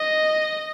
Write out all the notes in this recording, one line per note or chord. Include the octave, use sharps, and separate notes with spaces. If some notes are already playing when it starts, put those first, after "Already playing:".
Already playing: D#5